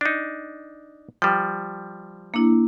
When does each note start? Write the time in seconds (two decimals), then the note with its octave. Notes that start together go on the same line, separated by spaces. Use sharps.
0.01 D4 D#4
1.22 F3 G3 G5
2.34 A#3 D4 E4